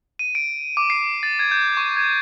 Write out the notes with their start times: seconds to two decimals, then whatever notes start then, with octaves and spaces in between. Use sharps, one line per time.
0.19 D#7
0.35 D7
0.77 D6
0.90 C7
1.23 A6
1.39 G#6
1.51 G6
1.77 C#6
1.97 G#6